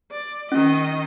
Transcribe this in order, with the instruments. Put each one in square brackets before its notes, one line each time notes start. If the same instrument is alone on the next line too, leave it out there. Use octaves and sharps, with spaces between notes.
[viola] D5
[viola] D#3 D#5 [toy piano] C#4